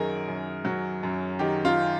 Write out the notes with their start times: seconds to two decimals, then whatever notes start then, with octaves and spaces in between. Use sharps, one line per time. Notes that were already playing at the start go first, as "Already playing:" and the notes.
Already playing: F#2 D#3 F#3 G#4 A#4
0.28 F#2
0.65 F#3
1.03 F#2
1.39 D#3 G4
1.65 F4